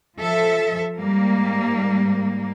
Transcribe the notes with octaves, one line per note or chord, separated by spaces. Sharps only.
F3 A4 E5
G#2 G3 A#3